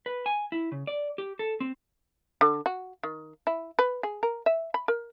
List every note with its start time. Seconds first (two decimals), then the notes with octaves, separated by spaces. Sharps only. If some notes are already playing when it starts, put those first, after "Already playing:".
0.06 B4
0.26 G#5
0.52 E4
0.72 C#3
0.87 D5
1.18 G4
1.39 A4
1.60 C4
2.41 D3
2.66 F#4
3.03 D#3
3.47 E4
3.79 B4
4.03 G#4
4.23 A#4
4.46 E5
4.74 B5
4.88 A#4